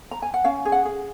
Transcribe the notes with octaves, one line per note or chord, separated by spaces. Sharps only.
A#5
G#5
F#5
C#4 F5
G#4
F#5
G#4